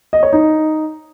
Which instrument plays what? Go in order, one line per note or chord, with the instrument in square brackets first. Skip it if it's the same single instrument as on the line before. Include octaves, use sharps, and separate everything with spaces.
[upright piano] D#5
C#5
D#4